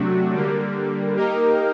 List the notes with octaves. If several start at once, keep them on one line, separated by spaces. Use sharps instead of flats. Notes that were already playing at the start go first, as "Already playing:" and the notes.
Already playing: C3 F#3 A3 D4 F#4
D3 G3 A#3
A#3 D#4 G4 A#4